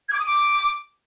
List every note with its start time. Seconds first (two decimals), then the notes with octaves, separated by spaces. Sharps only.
0.09 G#6
0.14 D6
0.20 D#6
0.25 D6